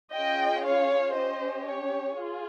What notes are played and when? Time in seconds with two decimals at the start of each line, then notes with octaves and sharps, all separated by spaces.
0.14 C#4 F4 G#4 D#5 G5
0.65 C#5 F5
1.16 C#4 G4 C5 D#5
1.67 C#5
2.17 F4 G#4